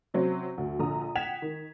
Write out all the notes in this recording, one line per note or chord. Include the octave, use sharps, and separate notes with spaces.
C3 F#3 C4 C#4
D2
A#1 D3 A#5 D#6
F#5 G5 G#6 B6 E7 F7
D#3